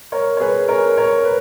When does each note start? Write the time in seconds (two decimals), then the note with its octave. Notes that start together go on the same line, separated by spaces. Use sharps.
0.12 A#4 C#5
0.37 C#5
0.40 G#4 B4
0.68 A#4 C#5
0.97 A#4 C#5
1.25 B4